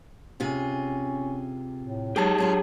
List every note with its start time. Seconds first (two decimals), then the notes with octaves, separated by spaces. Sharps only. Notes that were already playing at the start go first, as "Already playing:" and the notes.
0.40 C3 C#4 F4 G#4
1.81 A2
2.16 F#3 G#3 D#4 G4 G#4 A5
2.38 F#3 G#3 D4 F4